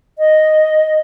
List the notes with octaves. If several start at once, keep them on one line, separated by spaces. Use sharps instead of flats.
D#5